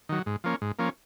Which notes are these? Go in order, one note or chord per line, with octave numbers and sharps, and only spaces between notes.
D#3 F#3
G#2
F3 A#3 C#4
G#2
F3 A#3 C#4